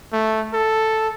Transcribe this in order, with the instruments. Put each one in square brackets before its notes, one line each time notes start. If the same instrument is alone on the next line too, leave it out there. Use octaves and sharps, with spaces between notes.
[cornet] A3
A4